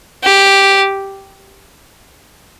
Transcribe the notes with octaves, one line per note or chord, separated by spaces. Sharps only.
G4